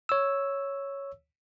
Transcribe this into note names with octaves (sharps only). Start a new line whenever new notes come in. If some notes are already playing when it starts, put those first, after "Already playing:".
C#5 E6